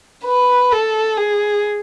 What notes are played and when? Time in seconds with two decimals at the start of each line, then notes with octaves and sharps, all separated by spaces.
0.25 B4
0.71 A4
1.17 G#4